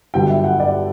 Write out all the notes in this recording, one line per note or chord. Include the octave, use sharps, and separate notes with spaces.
G1 G2 D3 F#3 G5
E5
F#5
D5